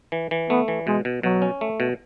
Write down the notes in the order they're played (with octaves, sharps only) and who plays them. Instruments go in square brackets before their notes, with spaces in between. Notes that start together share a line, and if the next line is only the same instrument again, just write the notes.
[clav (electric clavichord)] E3
E3
[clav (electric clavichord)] A3 [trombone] B3
[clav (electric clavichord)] E3
[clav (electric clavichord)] B2 [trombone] G#3
[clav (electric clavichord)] B2
[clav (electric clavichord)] B2 [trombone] F#3
[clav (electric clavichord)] C#4
A3
B2